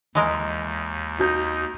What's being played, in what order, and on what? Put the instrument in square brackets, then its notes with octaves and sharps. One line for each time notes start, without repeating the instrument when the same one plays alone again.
[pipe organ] D#2 [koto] E3 G#3 A#4
[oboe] D#4 [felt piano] F#4 G6